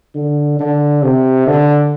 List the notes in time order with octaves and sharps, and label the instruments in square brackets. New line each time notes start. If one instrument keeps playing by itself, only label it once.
[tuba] D3
D3
C3
D3